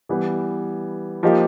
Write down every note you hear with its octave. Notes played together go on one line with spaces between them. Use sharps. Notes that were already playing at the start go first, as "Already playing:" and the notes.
E3 G3 B3
F3 A#3 D#4 G4